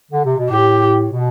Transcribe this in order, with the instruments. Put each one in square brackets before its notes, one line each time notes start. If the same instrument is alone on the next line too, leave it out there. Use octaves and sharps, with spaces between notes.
[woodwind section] D3
C3
B2
[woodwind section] A2 [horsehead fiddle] G4
[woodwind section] B2